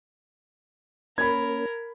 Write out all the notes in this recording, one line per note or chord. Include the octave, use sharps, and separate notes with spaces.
A#3 C#4 A#4 B5 G#6